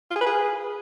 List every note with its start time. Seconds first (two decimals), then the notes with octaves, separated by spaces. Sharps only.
0.10 F4
0.16 G#4
0.21 B4
0.26 G#4